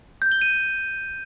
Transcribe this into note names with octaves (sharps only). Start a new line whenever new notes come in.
G6
G7
D#7